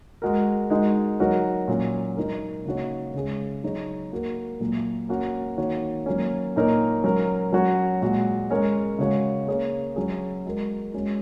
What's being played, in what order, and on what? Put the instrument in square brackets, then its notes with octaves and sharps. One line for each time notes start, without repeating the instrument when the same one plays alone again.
[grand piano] G#3 F#4 A#4
G#3 D#4 F#4 A#4
F#3 D#4 F#4 A#4 C#5
A#2 F#3 C#4
F#3 D#4 A#4
C#3 A#3 D#4 F#4 C#5
C#3 G#3 C#4 G#4
F#3 D#4 G#4 C#5
A#3 F#4 A#4
A#2 F#3 A#3
A#3 C#4 F#4
D#3 A#3 F#4 C#5
F#3 A#3 C#4
A#2 A#3 D#4 A#4 C#5
F#3 C#4 A#4
F#3 C#4 F#4 C#5
A#2 G#3 F#4
G#3 C#4 A#4 C#5
C#3 G#3 F#4 C#5
A#3 C#4 G#4 C#5
F#3 C#4 G#4
G#3 F#4 A#4
G#3 C#4 F#4